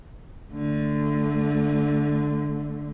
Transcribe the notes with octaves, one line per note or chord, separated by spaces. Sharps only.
D3 A3